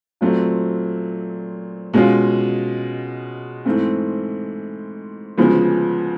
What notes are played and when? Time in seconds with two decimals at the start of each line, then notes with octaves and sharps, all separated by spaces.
0.21 A#2 F#3 A3 C4
1.94 B2 G#3 C#4 F4
3.65 G#2 E3 A3 C4
5.38 D2 C#3 F3 G#3 B3